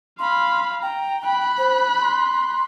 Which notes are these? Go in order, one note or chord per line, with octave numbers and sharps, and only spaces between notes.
F5 B5 C6
G5 A#5
B5 F#6
C5
C6